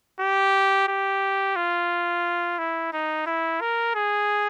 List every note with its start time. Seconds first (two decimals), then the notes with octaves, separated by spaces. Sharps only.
0.20 G4
0.88 G4
1.56 F4
2.59 E4
2.93 D#4
3.26 E4
3.61 A#4
3.95 G#4